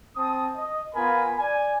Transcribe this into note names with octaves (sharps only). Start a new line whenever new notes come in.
C4 A5 D#6
D#5
B3 F4 A#4 G#5 B5
D5 G#5